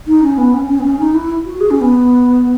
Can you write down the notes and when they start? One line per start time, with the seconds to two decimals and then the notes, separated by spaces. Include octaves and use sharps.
0.07 D#4
0.23 C#4
0.38 B3
0.54 C#4
0.69 C#4
0.79 B3
0.84 C#4
0.99 D#4
1.14 E4
1.45 F#4
1.61 G#4
1.70 C#4
1.81 B3